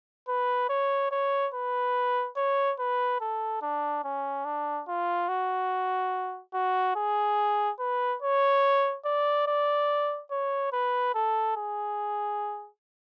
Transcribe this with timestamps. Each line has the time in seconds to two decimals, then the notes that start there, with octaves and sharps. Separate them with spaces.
0.28 B4
0.69 C#5
1.11 C#5
1.54 B4
2.37 C#5
2.79 B4
3.21 A4
3.62 D4
4.04 C#4
4.45 D4
4.88 F4
5.29 F#4
6.54 F#4
6.96 G#4
7.79 B4
8.22 C#5
9.05 D5
9.47 D5
10.31 C#5
10.72 B4
11.15 A4
11.56 G#4